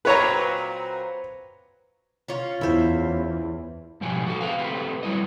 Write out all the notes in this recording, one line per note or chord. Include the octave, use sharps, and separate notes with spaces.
A#2 F#3 C4 B4 C#5 A#5
C#4 F4 C#5
E2 E4 C5
G#2 B2 F3 G4 G#5
F#4 A4
C4 G#4 B4 F5
A3 C4 G4 B4
F#3 G3 E4 D#5